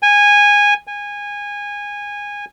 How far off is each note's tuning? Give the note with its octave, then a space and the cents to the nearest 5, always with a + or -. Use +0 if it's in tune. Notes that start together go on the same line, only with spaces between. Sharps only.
G#5 -15
G#5 -20